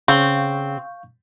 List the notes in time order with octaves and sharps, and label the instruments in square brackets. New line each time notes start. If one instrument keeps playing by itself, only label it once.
[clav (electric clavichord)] C#3 [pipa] C4 [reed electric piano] F5 C#6 G6